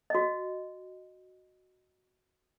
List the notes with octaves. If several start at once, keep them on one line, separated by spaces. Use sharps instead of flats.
F#4 D#5